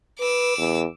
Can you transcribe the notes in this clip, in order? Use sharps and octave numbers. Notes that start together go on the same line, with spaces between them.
B4 D6 E6
E2